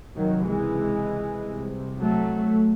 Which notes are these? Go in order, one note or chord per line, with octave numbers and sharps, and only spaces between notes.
C#2 C3 D#3 F#3
E3 G#3
C2 C3
F#3 A3